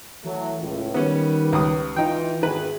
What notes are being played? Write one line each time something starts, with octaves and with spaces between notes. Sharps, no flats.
E3 F#3 A3
C#2 A2
D#3 G3 B3 C#4 B4
C#2 D#6
E3 D#4 F4 G5
G#1 E2 D#3 G#4 B4